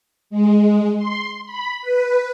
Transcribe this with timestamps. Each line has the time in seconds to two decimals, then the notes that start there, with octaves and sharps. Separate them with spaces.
0.30 G#3
0.97 C6
1.46 B5
1.82 B4